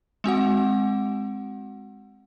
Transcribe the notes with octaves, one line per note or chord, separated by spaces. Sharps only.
G#3 C4 F#4 F#5